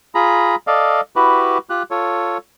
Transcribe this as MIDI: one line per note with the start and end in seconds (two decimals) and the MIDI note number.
0.15 0.55 65
0.15 0.55 68
0.15 0.55 82
0.15 0.55 83
0.67 1.01 69
0.67 1.01 74
0.67 1.01 75
0.67 1.01 77
1.16 1.58 64
1.16 1.58 66
1.16 1.58 67
1.16 1.58 71
1.70 1.83 65
1.70 1.83 67
1.70 1.83 90
1.91 2.38 65
1.91 2.38 69
1.91 2.38 73